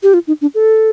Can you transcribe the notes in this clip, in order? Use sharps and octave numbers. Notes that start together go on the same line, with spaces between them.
G4
F4
D#4
D4
A4